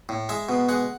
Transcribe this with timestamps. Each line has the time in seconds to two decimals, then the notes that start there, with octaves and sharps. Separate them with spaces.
0.09 A2
0.29 G#3 E5
0.49 B2
0.69 G#3 F#5